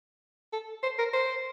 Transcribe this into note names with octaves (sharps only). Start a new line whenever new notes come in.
A4
C5
A#4
C5